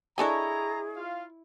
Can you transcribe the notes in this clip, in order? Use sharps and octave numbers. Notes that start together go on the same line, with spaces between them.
D4 E4 G#4 A4 C#5 D#5 G#5 A#5
F4 F5